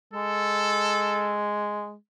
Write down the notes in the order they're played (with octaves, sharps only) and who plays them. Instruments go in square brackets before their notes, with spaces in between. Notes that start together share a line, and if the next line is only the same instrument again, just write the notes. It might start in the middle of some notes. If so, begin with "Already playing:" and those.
[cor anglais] G#3 [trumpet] A4